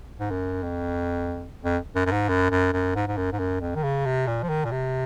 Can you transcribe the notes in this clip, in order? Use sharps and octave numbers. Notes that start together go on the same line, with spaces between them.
G#2
F#2
F2
F2
F#2
F#2
G#2
F#2
F#2
F#2
G#2
G#2
F#2
G#2
F#2
F2
D#3
C#3
C3
A#2
F3
D#3
A#2
C3